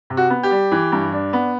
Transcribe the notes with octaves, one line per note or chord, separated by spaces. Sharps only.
C3
F#4
B3
G4
G3
E3
G2
D4
B3